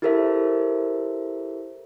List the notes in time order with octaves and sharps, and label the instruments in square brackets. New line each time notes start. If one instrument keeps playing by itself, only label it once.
[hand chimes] E4 G4 A4 A#4 C5 E5